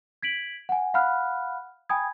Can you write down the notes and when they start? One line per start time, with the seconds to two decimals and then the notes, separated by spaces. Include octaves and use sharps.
0.23 G#6 B6 D7 F#7
0.69 F#5 G#5
0.94 F5 F#5 B5 F6 F#6
1.89 G5 G#5 B5 D#6 G#6